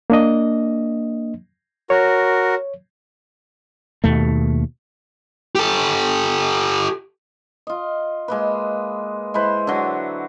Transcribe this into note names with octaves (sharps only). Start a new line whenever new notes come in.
A#3 D4 D#5
F#4 A#4 C#5
D#2 B2 A3
G4 A4
F4 D#5
G#3 A#3 B4
G#3 E4 B4 C5
D3 F#3